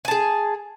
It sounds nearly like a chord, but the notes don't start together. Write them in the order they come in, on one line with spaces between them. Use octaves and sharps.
G#5 A5 G#4